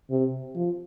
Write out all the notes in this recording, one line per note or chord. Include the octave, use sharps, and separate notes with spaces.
C3
F3